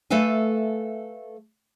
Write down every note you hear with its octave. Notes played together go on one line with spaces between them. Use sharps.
A3 A4 B4 E5 F5 G#5